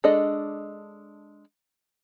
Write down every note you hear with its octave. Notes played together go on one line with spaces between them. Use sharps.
G#3 D4 A4 D5 D#5